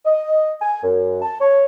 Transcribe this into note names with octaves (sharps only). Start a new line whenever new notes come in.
D#5
G#5
F#2
A5
C#5